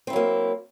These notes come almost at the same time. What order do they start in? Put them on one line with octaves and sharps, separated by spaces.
C4 E4 F#3 A#3